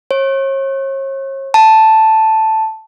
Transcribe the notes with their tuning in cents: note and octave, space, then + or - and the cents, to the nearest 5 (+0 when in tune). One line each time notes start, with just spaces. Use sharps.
C#5 -40
A5 +0